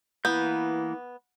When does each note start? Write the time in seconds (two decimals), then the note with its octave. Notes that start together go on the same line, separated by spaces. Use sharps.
0.25 E3 A#3 B3 E4 G6